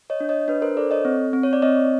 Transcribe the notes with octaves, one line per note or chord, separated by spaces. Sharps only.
C#5 D#5
D4
C#5 D#5
D4 B4
A#4 C5
A4 C5 D5
C#5 D#5
C4
C4
C#5
D5
C4 C#5 D#5